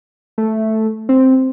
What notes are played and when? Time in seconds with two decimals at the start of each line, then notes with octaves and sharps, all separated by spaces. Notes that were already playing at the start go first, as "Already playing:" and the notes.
0.38 A3
1.09 C4